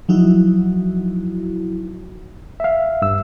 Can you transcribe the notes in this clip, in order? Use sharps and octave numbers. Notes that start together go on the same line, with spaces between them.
F3 F#3 D#4 E4 F#4
E5 F5
G2 E6